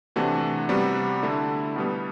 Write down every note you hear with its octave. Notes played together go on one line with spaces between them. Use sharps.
C3 E3 A3 D4 F#4
C3 G3 B3 F#4
D3 A3 E4
B2 G3 B3